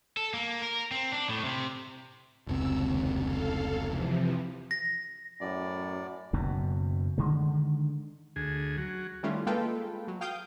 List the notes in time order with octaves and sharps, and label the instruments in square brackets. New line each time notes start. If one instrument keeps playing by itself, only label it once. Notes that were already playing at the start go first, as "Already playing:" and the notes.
[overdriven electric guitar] A4
A#3
A#4
C4
D4
A2
C3
[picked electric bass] F1 C#2 C4 [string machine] E6
[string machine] D#2
A4 F5
C3 E3 F3
[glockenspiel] A#6
[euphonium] F#2 [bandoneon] A2 D5
[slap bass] F#1 F#2 B2
D3 D#3 G#3
[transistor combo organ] D2 G#4
F#3
[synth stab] D#3 G3 A3 C#4 E4 F4
G#3 A#3 F4 A4 B4 G5
F#3
F5 G5 D#6 G6